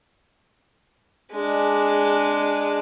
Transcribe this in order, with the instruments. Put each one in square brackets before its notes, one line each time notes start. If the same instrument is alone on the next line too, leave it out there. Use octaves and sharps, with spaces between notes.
[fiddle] G#3 D4